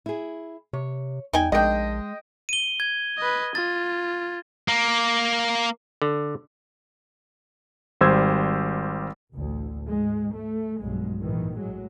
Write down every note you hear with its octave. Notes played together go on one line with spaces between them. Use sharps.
E4 G#4
C3 C#5
E2 G3 D#4 G5 G#5
A#1 D#3 G#3 D4 D#5 G5
D#7 G7
G#6
B4 D#5
F4 A6
A#3
D3
G#1 G3 C5 E6 G#6
A1 D2
G#2 G#3
A3
B1 G2 G#3
A#1 G#2 D#3 E3
A2 F#3 G#3